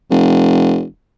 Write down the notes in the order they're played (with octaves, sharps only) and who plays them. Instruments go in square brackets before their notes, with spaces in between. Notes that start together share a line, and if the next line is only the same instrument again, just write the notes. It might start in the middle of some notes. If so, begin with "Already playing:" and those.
[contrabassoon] F1